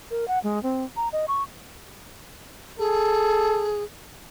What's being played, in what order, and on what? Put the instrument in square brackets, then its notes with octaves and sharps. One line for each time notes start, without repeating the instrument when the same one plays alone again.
[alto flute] A#4
F#5
G#3
C4
A#5
D#5
C#6
[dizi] G#4 [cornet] A4